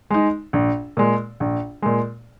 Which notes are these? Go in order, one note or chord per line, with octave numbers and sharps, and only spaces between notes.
G#3 D#4
A#1
A#2 G#3
A#1
A#2 G#3